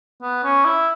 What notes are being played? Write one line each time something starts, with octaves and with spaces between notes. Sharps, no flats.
B3
C#4
E4